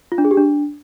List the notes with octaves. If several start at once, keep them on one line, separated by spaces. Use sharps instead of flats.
F4
D4
G#4
G4
D4